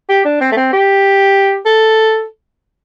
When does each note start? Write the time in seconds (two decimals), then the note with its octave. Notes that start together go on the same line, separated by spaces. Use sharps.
0.09 G4
0.25 D4
0.41 C4
0.52 A3
0.56 C4
0.73 G4
1.66 A4